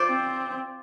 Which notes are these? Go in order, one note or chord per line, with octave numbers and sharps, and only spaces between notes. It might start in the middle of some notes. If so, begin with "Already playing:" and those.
Already playing: F4 C5 D5
C4